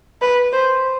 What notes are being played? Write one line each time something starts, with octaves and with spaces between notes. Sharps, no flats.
B4
C5